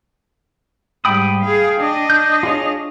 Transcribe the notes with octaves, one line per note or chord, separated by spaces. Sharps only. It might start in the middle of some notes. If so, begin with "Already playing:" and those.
G#2 G3 G5 B5 D#6
G#4 F5
D4 D#5
G6
F4 G#4 C#5